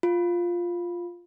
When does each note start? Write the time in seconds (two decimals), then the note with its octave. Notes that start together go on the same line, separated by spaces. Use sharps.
0.03 F4